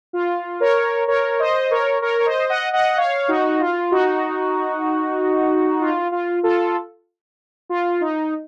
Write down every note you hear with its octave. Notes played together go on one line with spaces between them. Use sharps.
F4
A#4 C#5
A#4 C#5
C5 D#5
A#4 C#5
A#4 C#5
C#5
C5 D#5
D#5 F#5
D#5 F#5
C#5 F5
D#4 F#4
F4
D#4 F#4
F4
F4
F4 A4
F4
D#4